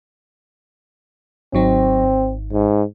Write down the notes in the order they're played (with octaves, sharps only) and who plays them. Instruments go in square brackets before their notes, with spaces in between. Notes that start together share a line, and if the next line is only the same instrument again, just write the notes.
[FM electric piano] G#1 F#3 D#4 [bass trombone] C4
[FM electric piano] G#1
[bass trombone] G#2